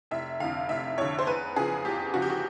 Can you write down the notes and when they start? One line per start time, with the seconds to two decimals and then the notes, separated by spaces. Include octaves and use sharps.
0.11 F1 E5
0.40 F2 D3 F5
0.69 F1 E5
0.98 F2 D3 C#5
1.19 C5
1.27 E2 B4
1.56 C#3 F3 G#4
1.85 E2 G4
2.14 C#3 F3 F#4
2.22 G4
2.30 F#4